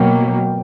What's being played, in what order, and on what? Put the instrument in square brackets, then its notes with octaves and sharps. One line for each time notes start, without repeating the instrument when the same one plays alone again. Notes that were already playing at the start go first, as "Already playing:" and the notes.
Already playing: [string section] B2 F#3 A#3 [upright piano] G5